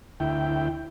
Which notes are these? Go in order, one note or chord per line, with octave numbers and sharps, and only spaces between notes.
D2 E4 G5